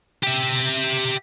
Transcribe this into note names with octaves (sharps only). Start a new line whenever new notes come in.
G4 E5